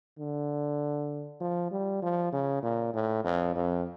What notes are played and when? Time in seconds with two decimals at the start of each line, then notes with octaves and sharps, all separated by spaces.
0.18 D3
1.40 F3
1.71 G3
2.02 F3
2.33 C#3
2.63 A#2
2.94 A2
3.24 F2
3.55 F2